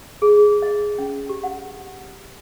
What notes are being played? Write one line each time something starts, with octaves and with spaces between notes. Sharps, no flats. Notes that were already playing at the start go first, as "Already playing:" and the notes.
G#4
D#5
C#4
G4
F#5